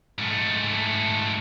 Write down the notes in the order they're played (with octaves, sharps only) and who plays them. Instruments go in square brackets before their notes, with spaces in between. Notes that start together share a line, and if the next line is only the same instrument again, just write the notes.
[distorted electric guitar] G#2 A3